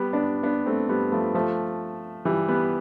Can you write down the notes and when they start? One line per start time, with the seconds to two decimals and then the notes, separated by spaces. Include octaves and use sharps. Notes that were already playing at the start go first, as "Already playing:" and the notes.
Already playing: G3 B3
0.13 B3 D4
0.43 B3 D4
0.66 A3 C4
0.89 G3 B3
1.12 F3 A3
1.34 F3 A3
2.25 E3 G3
2.48 G3 B3